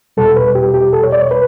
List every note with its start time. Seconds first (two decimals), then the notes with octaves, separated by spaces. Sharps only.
0.17 E2 B2 G3 A4
0.36 B4
0.55 G4
0.74 G4
0.93 A4
1.03 C#5
1.12 D5
1.21 C#5
1.31 B4